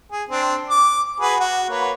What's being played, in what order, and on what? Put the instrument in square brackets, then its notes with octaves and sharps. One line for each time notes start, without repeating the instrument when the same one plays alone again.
[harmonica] G#4
C4 D4
D6
F#4 G#4 B4
F#4
A#3 B4 C#5